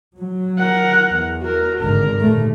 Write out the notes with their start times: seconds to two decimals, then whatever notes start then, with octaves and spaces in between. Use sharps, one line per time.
0.17 F#3
0.59 A#4 F#5
1.10 E2
1.42 F#4 A#4
1.79 G#1 D3 A#4
2.21 D#2 A#2 A3